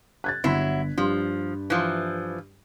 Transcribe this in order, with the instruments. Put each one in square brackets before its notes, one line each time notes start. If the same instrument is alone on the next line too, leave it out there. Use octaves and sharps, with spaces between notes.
[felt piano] F#6 G#6 A6
[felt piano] G1 B6 [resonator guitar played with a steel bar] F#3 E4
[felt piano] G2 [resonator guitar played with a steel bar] F3
[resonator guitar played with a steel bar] E3 F3